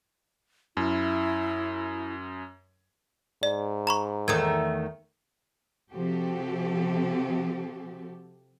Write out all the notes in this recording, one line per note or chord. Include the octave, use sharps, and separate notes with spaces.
F#2 E4
G#2 D5
A#5 B5 C#6
E2 D#3 A3 D#6 G#6
C3 F3 F#4 G4 A4